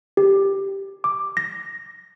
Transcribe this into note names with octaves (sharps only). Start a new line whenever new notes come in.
G4
D6
A#6